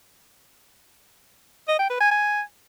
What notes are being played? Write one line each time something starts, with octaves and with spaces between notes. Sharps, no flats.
D#5
G5
B4
G#5
G#5